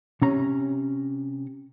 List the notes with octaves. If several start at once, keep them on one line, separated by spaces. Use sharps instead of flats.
C3 C#4 A#5